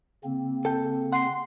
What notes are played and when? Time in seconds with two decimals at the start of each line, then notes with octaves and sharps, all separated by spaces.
0.24 C#3 A#3 C4
0.65 A4 G5
1.13 F#5 C6